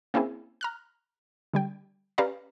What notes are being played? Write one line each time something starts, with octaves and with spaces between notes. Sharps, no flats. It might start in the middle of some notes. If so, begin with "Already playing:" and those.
A#3 C4 C#4 E4 G#4
A#5 F6 F#6
D3 G3 G5
C#4 G4 B4 D5 F5 A#5